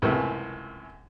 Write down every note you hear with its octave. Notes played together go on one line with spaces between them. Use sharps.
C#2 F#2 C3 E3 A3 A#3